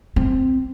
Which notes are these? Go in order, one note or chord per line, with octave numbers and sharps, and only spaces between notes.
C4